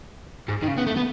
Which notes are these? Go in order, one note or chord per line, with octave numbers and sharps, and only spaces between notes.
G#2
D#3
C#3
B3
A3
B3